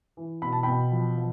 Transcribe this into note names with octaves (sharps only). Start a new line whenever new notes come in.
E3
B2 B5
A5
B2 G5 B5
F3
F3